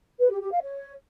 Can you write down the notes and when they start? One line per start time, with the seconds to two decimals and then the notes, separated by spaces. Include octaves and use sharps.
0.20 B4
0.30 G4
0.41 G4
0.51 F5
0.62 C#5